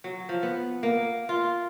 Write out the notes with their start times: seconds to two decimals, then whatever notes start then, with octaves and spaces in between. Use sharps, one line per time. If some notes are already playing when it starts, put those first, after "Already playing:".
0.04 F#3
0.29 F3
0.43 B3
0.83 A#3
1.29 F4